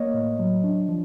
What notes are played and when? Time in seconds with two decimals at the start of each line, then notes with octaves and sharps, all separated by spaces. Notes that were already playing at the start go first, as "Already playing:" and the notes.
Already playing: A#3 C#5 D#5
0.14 A2
0.39 F#3
0.64 D4
0.89 F3